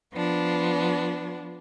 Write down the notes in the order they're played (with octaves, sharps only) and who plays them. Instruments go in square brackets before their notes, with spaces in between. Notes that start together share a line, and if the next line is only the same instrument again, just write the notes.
[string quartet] F3 B3 D4